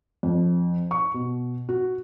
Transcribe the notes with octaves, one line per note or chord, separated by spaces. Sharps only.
F2
C#6
B2
F#4